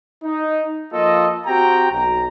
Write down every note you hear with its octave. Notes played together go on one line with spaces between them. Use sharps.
D#4
F3 A#3 F4 A4 D#5
C4 F#4 G4 G5 A#5
B1 A#5